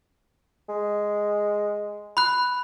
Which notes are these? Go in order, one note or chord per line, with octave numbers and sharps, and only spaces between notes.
G#3
B5 F#6